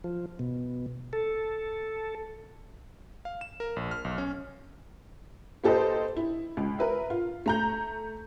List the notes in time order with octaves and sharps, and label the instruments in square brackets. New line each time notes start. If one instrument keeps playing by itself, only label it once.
[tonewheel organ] F3
B2
A4
[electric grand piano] F5
E7
A#4
A#1
F6
B1
C#4
[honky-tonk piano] A#3 G4 A4 B4 C5 D#5
E4
C#2
A#4 B4 E5
F4
A3 A#5 G6